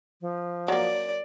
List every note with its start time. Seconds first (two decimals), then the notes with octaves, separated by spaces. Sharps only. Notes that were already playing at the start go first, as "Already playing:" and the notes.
0.21 F3
0.68 F#3 A#3 D5